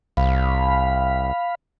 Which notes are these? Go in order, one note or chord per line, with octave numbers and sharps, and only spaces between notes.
C2 F5 B5